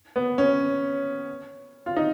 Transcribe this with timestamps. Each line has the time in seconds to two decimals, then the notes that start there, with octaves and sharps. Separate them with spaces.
0.16 B3
0.38 C#4
1.86 F4
1.96 D#4